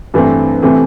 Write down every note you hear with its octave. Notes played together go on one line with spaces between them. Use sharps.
G2 E3 A3 C4
C3 E3 A3 C4